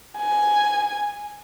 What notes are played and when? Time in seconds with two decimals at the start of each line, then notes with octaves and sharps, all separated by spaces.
0.18 G#5